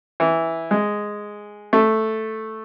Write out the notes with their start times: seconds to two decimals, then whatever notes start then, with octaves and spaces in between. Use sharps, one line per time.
0.20 E3
0.71 G#3
1.73 A3